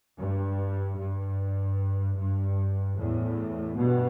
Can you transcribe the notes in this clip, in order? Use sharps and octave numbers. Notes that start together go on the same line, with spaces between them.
G2
G2
G2
E2 A2
G2 B2